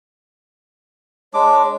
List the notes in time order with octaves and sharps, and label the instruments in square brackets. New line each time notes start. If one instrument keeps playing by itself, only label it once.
[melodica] G#3 D4 D6 [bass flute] C#5